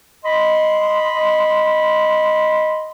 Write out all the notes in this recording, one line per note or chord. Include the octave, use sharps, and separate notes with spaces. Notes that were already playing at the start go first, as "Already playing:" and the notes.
D#5 B5 C6